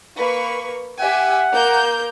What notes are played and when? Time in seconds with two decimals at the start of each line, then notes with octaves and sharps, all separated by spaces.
0.17 A#3 B4 C#6
1.00 G4 E5 F#5 G#5
1.52 A#3 A#4 G6